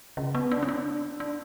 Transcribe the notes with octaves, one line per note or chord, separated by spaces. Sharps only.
C#3
B3
D4
C#4
D4
D4